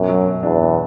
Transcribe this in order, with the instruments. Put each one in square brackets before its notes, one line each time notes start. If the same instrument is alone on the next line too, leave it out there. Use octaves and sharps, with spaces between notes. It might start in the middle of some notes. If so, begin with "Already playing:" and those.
Already playing: [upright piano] A1 B2 [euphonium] F#2
[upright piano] F#3
B2
[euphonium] E2 [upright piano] D4
[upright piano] B2